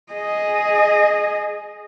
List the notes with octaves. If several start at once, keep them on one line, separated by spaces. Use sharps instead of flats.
G#4 D#5